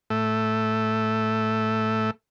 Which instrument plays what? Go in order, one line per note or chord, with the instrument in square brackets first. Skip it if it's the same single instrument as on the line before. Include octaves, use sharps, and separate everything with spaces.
[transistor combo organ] A2 A3